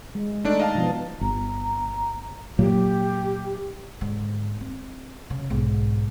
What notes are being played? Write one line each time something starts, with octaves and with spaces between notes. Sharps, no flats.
G#3
A3 D4 D#4 D5
D#5 F5 A5
B2 F3 B3
G1 A#5
A#2 F#3 A#3 G4
G#2 D3
C4
C#3
B1 G#2